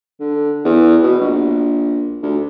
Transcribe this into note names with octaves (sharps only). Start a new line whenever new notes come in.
D3
E2
B2
A#1
D2